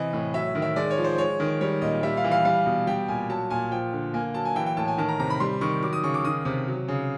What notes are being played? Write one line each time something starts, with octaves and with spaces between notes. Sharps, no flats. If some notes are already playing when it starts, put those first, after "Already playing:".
Already playing: C3 E3 D#5
A2
F#3 E5
D#3
E5
G#3 D5
C#5
F3
C5
G#3 C#5
D#3
G3 C#5
A#2 D#5
G3 E5
F5
E3
F5
G3 F5
B2
G3 G5
A#2 G#5
F#3 A5
A#2 G#5
F3 G5
D3
A#3 G#5
F#3 A5
G#5
E3 G5
G5
A2 A5
G#5
D#3 A5
A#5
C3 A#5
B5
G3 C6
D#3 C#6
F#3 D6
D#6
C#3 C#6
D6
D#3 D#6
C3
F#3
C#3